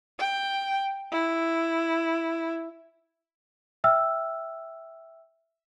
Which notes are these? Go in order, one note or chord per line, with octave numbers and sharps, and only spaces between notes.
G5
E4
E5 G5 E6 F6